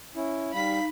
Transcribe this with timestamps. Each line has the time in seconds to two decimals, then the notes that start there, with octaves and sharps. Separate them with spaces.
0.15 C#4 E4
0.53 G3 D#4 F5 B5 B6